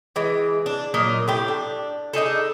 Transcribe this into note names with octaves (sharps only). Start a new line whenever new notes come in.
E3 G#3
D4
A#2 F#3 A#4 D#5
A2 G4
D4
D4 D#4 G#4 A4